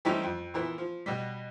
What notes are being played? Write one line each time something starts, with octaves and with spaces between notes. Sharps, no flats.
E3 G3 A3 C4 C#4 D#4
F2
A#2 E3 B3
F3
B2 G3